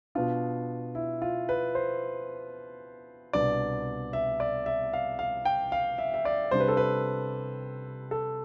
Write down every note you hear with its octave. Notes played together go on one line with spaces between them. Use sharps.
B2 B3 D4 F4
E4
F4
B4
C5
C2 B2 B3 D4 D5
E5
D5
E5
F5
F5
G5
F5
E5
E5
D5
C3 G3 D4 C5
B4
A4
B4
A4